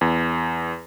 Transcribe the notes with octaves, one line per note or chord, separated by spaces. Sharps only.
E2